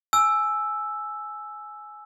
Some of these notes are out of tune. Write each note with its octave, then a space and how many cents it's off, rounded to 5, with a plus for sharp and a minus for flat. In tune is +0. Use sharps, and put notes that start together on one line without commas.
G#5 +15 E6 +0